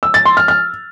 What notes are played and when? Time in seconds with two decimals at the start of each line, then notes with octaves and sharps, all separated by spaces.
0.03 E6
0.14 A6
0.25 C6
0.37 F6
0.48 F6